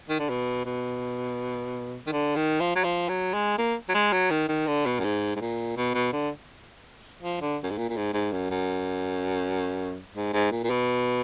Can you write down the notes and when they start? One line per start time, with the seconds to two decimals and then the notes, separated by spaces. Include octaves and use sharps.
0.09 D#3
0.19 D3
0.30 B2
0.65 B2
2.07 D#3
2.12 D3
2.36 D#3
2.61 F3
2.76 F#3
2.84 F3
3.09 F#3
3.34 G#3
3.58 A#3
3.89 F#3
3.94 G#3
4.12 F#3
4.30 D#3
4.48 D#3
4.67 D3
4.86 B2
4.99 F#2
5.04 G#2
5.36 G#2
5.40 A#2
5.77 B2
5.94 B2
6.13 D3
7.22 F3
7.41 D3
7.63 F#2
7.70 G#2
7.78 A#2
7.89 A#2
7.96 G#2
8.14 G#2
8.32 F#2
8.51 F#2
10.15 G#2
10.33 G#2
10.51 A#2
10.64 A#2
10.70 B2